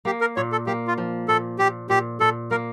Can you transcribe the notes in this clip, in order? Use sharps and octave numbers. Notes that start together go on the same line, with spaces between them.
A#3 G4
A#4
A#2 C#5
A4
A#3 G4
F4
F3
A#2 A4
A#2 G4
A#2 G4
A#2 A4
A#3 A#4